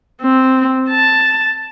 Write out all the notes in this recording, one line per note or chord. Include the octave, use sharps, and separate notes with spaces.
C4
A5